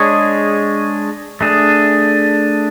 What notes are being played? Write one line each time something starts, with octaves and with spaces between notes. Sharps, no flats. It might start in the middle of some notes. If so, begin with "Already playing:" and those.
Already playing: G#3 D4 G#4 C#5
A3 D4 G#4